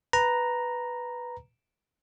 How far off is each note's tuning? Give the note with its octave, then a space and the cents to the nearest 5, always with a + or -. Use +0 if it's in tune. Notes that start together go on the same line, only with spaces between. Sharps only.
B4 +0 A#5 +0